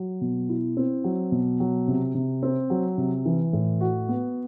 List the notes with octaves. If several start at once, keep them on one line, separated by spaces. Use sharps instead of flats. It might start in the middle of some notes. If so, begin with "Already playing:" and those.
Already playing: F#3
B2
E4
C4
F#3
B2
F#3
C3
C3
C4
F#3
C3
E3
A2
F#4
B3